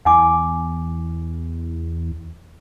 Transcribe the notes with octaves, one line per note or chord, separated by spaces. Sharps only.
E2 F#5 G#5 D6